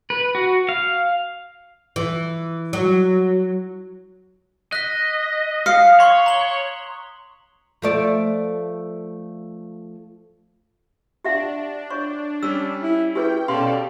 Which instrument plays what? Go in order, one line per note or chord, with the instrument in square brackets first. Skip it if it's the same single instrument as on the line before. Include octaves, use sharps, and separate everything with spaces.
[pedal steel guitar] B4
F#4
F5
[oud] E3
F#3
[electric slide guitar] D#5 [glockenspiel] F#6 B6
[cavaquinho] F5 [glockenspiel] D#6 C7 C#7
[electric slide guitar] C#5 [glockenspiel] C6 C#6
[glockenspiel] A#5 F#7 G7
[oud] F3 A3 D5
[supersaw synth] D4 [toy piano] G4 E5 F#5
[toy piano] C#5 C#6
[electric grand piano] G3 C#4 [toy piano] E6
[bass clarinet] E4
[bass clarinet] E4 [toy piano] G4 G#4 B4 [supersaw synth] G5
[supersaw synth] B2 A4 D5 [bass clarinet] C#4 [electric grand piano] G4 F5 [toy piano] C6